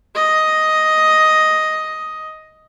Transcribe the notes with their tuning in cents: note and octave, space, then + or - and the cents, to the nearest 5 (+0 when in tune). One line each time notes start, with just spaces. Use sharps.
D#5 +5